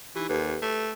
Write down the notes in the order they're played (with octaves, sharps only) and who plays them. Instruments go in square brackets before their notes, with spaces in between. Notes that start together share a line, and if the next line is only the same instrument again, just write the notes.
[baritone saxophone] E3 [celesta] D#4 G4
[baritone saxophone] D#2 [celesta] G4 A4 B4
[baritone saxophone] A3